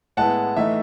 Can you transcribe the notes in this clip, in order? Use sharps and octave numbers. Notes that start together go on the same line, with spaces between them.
A2 G#3 B3 E4 F#5 A5
E3 A3 D#4 E5